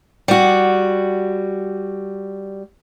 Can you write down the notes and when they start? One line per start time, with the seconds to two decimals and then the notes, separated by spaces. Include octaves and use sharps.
0.28 G3 F#4